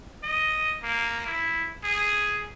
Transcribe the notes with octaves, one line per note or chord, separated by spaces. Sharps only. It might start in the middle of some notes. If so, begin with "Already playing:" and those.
D#5
A#3
E4
G#4